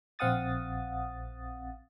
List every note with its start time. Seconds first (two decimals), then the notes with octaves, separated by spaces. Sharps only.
0.19 A#1 C4 F5 F#5 D#6 A6